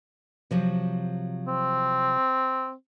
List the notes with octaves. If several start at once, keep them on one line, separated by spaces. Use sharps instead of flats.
C3 F3 F#3
C4